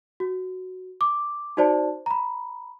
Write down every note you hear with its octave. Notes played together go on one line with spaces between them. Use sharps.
F#4
D6
D#4 F#4 C5 D5 A5
A#5 B5